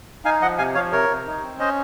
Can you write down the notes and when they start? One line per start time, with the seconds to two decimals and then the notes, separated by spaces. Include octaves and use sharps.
0.25 D#4 F5 G#5
0.41 F3 D#5 F#5
0.58 C3 F5 G#5
0.75 F3 C#5 F5
0.92 C3 A#4 C#5
1.09 C3
1.26 D#4
1.43 C4
1.59 C#4 C5 D#5